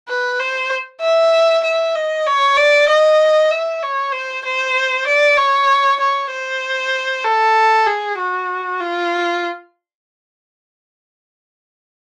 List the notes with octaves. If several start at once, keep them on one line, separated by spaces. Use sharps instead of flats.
B4
C5
E5
E5
D#5
C#5
D5
D#5
E5
C#5
C5
C5
D5
C#5
C#5
C5
A4
G#4
F#4
F4